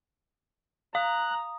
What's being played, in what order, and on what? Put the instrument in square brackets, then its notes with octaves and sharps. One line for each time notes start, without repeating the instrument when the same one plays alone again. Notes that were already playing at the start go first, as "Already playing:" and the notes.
[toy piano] F5 [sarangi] A#5 [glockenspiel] D#6 [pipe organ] F#6